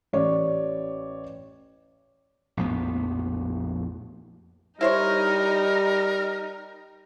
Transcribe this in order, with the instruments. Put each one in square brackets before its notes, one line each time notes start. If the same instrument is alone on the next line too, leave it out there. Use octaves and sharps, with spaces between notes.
[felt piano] A1 C#5 D5
[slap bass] A#1 F2 A2 B3
[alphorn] G3 [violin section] D#4 [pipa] E4 C5 C#5 [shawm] A#4